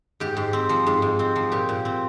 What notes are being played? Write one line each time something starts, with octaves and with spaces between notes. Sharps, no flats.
G#2 G4
G#2
C4
F3
G#2
G#2
C4
F3
A#2 G4
A#2
C4